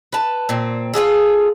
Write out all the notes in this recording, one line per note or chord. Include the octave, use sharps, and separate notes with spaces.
B4 A5
A#2 C4
F4 F#4 G#4 A4